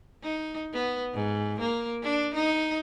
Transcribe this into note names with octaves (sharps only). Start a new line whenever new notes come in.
D#4
B3
G#2
A#3
D4
D#4